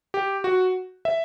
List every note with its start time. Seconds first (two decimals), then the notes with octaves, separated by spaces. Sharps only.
0.14 G4
0.44 F#4
1.05 E5